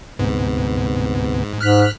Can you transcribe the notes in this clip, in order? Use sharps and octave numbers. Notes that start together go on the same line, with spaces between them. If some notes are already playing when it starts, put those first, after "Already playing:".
D2 G#2 C3 B3
G#2 F6 F#6 B6